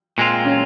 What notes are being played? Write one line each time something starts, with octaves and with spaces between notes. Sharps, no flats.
A#2 G#3 C4 F4
C#4